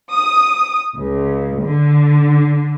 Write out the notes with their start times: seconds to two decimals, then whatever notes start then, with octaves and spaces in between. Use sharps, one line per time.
0.12 D#6
0.97 C#2
1.63 D3